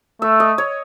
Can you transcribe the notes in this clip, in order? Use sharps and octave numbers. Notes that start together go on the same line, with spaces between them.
A3 E5
D#5
C#5